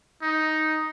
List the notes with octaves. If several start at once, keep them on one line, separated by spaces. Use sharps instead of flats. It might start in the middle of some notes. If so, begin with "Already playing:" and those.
D#4